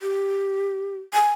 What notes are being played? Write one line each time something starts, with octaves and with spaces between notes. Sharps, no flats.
G4
G#5